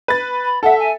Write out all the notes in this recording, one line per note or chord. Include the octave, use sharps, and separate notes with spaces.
B4 A6
B5
A4 E5 F#5
G#5